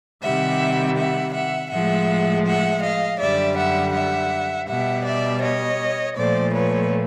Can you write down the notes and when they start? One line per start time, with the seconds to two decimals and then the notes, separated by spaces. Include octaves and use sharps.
0.23 C3 D#3 G3 E5 F#5
0.97 E5 F#5
1.34 E5 F#5
1.71 A2 F3 G#3 E5 F#5
2.45 E5 F#5
2.83 D#5 F5
3.19 F#2 D3 G3 D5 E5
3.57 E5 F#5
3.94 E5 F#5
4.68 B2 G3 E5 F#5
5.05 D5 E5
5.42 C#5 D#5
6.16 A#2 F3 A3 C5 D5
6.54 B4 C#5